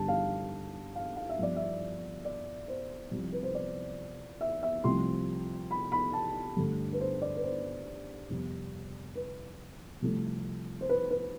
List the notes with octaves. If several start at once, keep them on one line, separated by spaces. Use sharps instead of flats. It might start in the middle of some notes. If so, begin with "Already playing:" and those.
Already playing: G2 D3 G3 A5
F5
F5
F5
E5
G2 F3 B3 D5
E5
D5
C5
C2 C3 F3
B4
C5
D5
E5
E5
C2 C3 F3 A3 C6
B5
B5
A5
G2 D3 A3
B4
C5
D5
B4
C5
F2 C3 G3 B3
B4
C2 C3 F3 A3
C5
B4
B4